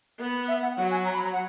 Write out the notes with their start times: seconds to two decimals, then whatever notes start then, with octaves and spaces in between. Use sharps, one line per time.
0.20 B3
0.48 E5
0.62 F#5
0.76 F#3 F#5
0.91 G#5
1.05 A#5
1.14 B5
1.24 A#5
1.33 F#5